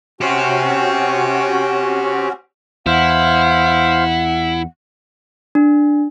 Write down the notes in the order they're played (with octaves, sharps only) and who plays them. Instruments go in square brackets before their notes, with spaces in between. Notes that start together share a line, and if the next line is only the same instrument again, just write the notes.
[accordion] C#4 F#4 [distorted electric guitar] G4 C5
[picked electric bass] E2 [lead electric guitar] E4 [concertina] C5 F5 [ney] F#5
[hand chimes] D4